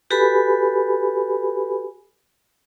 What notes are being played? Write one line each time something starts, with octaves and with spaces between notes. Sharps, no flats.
F#4 G4 A4 B4 G#5 B5